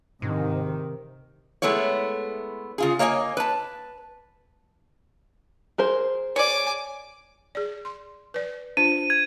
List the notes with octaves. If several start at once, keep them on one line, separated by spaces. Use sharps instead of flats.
G#2 C3 D#3
G#3 A3 B3 E4 C#5
C#3 F4 G#4
A#3 C#5 D#5 F#5 G#5
B4 A5
G#4 A#4 C5
C#5 D5 G#5 D6
G#4 D5
C6
B4 D5
D4 F4 C5 D#7
G#6